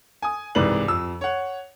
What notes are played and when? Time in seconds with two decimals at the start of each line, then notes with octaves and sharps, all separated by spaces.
0.22 G#5 D#6
0.55 C2 G#2 E3 B4 D5 F#7
0.88 F2 E6
1.21 C#5 F#5